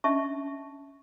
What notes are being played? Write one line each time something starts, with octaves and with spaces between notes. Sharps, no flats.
C#4 D4 D#5 E5 A5 C#6